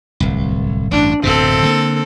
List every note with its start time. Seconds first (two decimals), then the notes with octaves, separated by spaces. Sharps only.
0.20 D1 C2
0.91 A1 G2 D4
1.24 D1 F#2 B2 C4 A4
1.63 D3 A#3